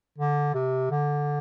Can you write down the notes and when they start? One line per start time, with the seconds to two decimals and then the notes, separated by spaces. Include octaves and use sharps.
0.18 D3
0.55 C3
0.91 D3